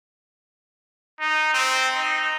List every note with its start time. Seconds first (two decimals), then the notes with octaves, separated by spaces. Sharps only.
1.20 D#4
1.54 C4
1.95 D#4